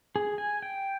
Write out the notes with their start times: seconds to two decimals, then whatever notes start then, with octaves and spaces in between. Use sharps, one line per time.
0.16 G#4
0.38 G#5
0.62 G5